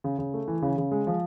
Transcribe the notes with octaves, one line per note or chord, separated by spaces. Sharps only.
C#3
C#3
A3
E3
C#3
C#3
G#3
F3